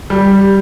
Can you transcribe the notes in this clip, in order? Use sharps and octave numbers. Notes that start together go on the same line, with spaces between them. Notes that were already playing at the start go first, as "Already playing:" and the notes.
G3